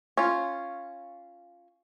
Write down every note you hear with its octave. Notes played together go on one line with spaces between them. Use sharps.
C#4 F4